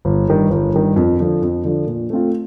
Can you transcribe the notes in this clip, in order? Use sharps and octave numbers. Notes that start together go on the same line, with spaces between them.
G1
G2 D#3
G1
G2 D#3
F2
D3 F3
F2
D3 F3
A#2
A3 C4 F4